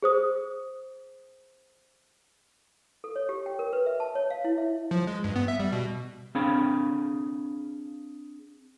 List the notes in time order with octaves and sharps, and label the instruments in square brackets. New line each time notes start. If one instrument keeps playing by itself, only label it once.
[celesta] G#4 C5 D#6
[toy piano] A4
C#5
G4
G5
A#4
B4
E5
A5
C#5
F5
E4
E5
[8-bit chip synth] F3
G#3
G2
B3
E5
G3
B2
[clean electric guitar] C4 D4 G#4 F5 B5